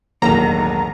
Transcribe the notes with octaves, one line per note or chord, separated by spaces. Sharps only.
E1 B1 A2 D#3 A#3 A#5